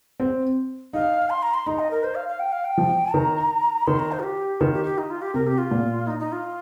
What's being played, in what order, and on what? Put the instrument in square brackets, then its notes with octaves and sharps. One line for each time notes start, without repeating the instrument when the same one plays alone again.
[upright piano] C4
[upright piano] D#4 [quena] F5
[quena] C6
A#5
C6
[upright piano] D#4 [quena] A#5
[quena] D#5
A#4
C5
F5
F5
G5
F5
G5
[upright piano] F3
[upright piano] D#3 [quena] A#5
[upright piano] D#3 [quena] C6
[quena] A#5
C5
F4
G4
[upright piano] D#3 [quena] F4
[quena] G4
G4
D#4
F4
G4
[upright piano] C3 [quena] A#4
[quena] G4
F4
[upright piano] A#2
[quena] D#4
D#4
F4